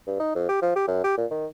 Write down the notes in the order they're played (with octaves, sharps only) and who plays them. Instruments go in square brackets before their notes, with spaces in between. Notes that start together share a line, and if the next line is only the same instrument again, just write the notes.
[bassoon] G2
D#4
F2
G4
F3
G4
F#2
G4
A#2
D#3